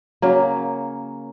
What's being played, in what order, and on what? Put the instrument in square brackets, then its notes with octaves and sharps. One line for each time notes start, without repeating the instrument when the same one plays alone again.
[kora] C#3 F#3 A#3